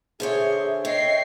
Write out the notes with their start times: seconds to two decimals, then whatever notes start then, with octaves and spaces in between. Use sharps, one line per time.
0.20 D3 G#4 C5 C#5 E5
0.85 C#5 D#5 G5 C7